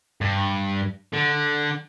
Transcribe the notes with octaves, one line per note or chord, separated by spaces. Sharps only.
G2
D3